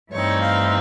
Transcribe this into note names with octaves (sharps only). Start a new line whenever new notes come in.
G2 E3 A3 C4 D#4 C#5
F5